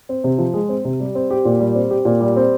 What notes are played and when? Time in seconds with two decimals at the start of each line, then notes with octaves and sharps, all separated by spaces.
0.09 C4
0.24 C3
0.38 F3
0.54 G#3
0.69 C4
0.85 C3
1.00 G3
1.15 C4
1.31 G4
1.45 A#2
1.60 G3
1.75 C4
1.90 G4
2.05 A#2
2.20 G3
2.36 C4